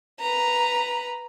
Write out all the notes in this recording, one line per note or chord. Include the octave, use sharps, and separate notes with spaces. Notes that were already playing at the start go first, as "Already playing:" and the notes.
B4 A#5